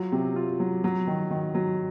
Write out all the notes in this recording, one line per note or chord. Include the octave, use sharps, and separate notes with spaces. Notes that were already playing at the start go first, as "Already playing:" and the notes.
Already playing: F#3 F4
C3
F4
F#3
F#3
D#3
D#3
F#3